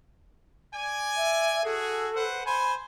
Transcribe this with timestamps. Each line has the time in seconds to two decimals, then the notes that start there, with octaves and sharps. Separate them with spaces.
0.74 D5 G#5
1.16 E5
1.64 F#4 G#4 A4
2.15 B4 C5 F#5
2.46 C5 G#5 B5